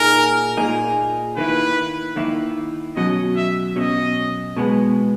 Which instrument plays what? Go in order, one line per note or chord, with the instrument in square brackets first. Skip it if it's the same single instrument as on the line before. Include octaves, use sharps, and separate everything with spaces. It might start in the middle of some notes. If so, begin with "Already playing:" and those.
Already playing: [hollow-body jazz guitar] A#2 A#3 D#4 G#4 [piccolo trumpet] A#4
[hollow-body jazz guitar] A#2 A#3 D#4 G#4
[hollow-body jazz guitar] D#3 A#3 E4 [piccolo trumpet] B4
[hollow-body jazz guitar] D#3 A#3 E4
[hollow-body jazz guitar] B2 F#3 C#4 [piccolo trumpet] D#5
[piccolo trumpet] E5
[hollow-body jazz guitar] B2 F#3 C#4 [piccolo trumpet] D#5
[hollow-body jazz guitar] B2 G#3 B3